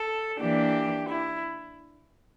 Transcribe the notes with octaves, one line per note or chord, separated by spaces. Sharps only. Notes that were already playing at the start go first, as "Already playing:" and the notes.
Already playing: A4
E3 A#3 D4 G4
E4